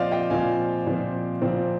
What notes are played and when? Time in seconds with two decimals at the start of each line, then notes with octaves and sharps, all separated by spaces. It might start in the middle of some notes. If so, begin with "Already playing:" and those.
Already playing: A#2 F3 C4 C5 D5 D#5 F5
0.11 D#5 G5
0.30 A#2 F3 C4 F5 G#5
0.86 A#2 F3 C4
1.42 A#2 F3 C4